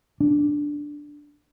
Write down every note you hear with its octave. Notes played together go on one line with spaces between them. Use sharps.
D4